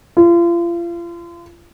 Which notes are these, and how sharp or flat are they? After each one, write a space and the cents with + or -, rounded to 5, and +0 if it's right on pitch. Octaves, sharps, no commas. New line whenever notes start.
F4 -35